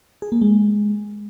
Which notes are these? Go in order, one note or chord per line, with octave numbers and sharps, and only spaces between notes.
G#4
A#3
G#3